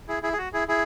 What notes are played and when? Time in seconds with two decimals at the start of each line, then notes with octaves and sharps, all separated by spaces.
0.08 E4 G#4
0.23 E4 G#4
0.33 G#4
0.38 F#4
0.53 E4 G#4
0.68 E4 G#4